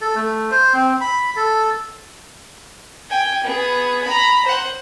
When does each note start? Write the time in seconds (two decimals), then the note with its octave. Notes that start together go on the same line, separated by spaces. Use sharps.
0.01 A4
0.15 A3
0.51 C5
0.74 C4
1.01 B5
1.36 A4
3.10 G5 G#5
3.44 B3 G#4
4.04 A#5 B5
4.45 C5 F#5